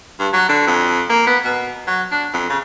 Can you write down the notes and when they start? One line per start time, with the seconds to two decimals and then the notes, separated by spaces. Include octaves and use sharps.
0.20 G2
0.33 F#3
0.49 D3
0.67 F2
1.09 A#3
1.27 B3
1.45 B2
1.88 F#3
2.11 D4
2.33 F2
2.50 C#3